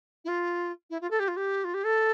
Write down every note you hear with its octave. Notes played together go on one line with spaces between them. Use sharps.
E4
F4
E4
F4
A4
G4
F4
G4
F4
G4
A4